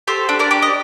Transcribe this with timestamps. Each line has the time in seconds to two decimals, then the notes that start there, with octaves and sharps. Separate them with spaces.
0.07 G4 A4 C5
0.29 D4
0.39 A#4 D5
0.51 G4
0.62 D#5